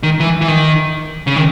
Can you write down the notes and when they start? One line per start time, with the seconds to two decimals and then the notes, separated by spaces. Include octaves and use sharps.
0.03 D#3
0.20 E3
0.41 E3
0.48 D#3
1.27 C#3
1.36 D#3